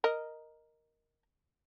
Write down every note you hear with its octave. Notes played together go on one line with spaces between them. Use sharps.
A#4 D#5